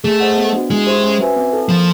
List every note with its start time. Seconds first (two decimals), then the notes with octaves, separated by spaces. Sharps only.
0.04 A3 G#4
0.20 C5 D#5 F#5
0.37 B3
0.53 D4 F#4
0.70 G#3 E4
0.87 G4 C5 E5
1.03 C#4
1.20 F#4 B4 E5 G#5
1.36 C4
1.53 E4 A4
1.69 F3 A#3